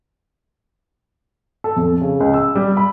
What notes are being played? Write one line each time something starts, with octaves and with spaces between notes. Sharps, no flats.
A4
F2
C#3
C#2
E6
G3
B5